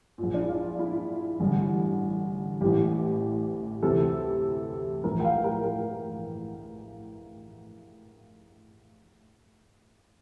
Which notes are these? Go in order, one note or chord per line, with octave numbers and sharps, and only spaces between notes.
A#1 A#2
D4
E4
F4
E4
A1 G2 D3
A1 A2 E3 G4
D2 C3 E3 A4
A#1 A2 E3 A#4
G5
F5
A#4
A#4